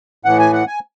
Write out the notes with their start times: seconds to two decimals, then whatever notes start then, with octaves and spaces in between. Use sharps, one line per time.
0.25 A2 E3 F#5
0.39 G#5
0.53 F#5
0.67 G#5